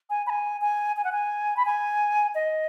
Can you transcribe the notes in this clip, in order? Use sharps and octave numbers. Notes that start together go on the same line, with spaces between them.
G#5
B5
G#5
G#5
G#5
F#5
G#5
B5
G#5
D#5